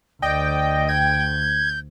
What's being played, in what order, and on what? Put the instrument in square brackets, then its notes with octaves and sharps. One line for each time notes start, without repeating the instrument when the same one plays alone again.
[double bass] D2 [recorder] D5 [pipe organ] D#5 [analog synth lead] G5
[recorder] G6 [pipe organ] G#6